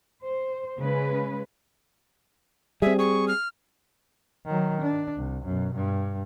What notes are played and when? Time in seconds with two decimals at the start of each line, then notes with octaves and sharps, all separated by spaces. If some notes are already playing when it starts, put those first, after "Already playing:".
0.24 C5
0.79 C#3 G#3 C#4 B4
2.82 G3 C4 G#4 E5
2.99 G#4 C#6
3.28 F6
4.46 D#3 F#3
4.81 D4
5.16 C2
5.45 F#2 B2
5.75 G2